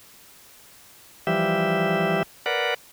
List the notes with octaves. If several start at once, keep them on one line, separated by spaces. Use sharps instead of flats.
E3 F3 G3 G4 E5
A#4 B4 D5 F#5